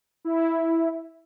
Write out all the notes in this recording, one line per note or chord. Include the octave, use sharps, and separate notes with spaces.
E4